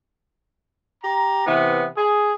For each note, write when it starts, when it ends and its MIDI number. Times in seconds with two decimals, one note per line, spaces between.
1.03 1.44 67
1.03 1.44 82
1.47 1.86 48
1.47 1.86 52
1.47 1.86 59
1.97 2.33 68